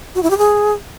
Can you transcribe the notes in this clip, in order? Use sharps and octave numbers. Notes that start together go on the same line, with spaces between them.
F#4
E4
G4
G#4